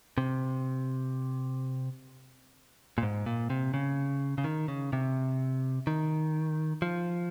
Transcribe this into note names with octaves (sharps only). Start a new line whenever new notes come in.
C3
A#2
G#2
A#2
C3
C#3
C#3
D#3
C#3
C3
D#3
F3